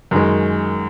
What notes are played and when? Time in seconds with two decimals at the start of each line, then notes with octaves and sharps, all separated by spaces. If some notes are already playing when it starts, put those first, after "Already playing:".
0.11 F#2 D#3 G#3